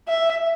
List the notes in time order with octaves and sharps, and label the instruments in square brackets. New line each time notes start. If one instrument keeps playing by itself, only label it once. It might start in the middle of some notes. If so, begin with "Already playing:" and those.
[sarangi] E5